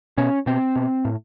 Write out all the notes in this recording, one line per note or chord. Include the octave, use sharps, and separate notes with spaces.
B2 C#4
B2 C4
B2
A2